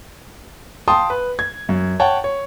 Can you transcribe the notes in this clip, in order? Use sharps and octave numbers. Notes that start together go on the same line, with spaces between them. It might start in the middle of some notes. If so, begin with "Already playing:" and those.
F5 G5 A5 C6 D#6
B4
G#6
F#2
C#5 F#5 G5 A5
C#5